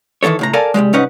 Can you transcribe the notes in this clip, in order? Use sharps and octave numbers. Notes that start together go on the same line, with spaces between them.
D#3 E3 C4 A4 C#5
C#2 A2 A#5
A4 A#4 D5 F5 G#5 A5
C2 B2 G3 G#3
C2 G#2 C#4 D#4 B4 F#5